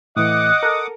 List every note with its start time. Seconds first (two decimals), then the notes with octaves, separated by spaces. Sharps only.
0.17 A2 E3 D#5 F#5 D6 D#6 F#6
0.63 A4 A#4